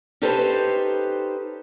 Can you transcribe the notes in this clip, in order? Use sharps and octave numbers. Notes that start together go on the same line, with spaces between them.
C#4 D#4 G4 A4 B4 C5